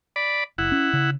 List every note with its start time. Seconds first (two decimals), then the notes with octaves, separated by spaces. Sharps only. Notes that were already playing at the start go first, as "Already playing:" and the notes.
0.16 D5 B5
0.58 F#1 E4 F#5
0.72 C#4
0.93 C#3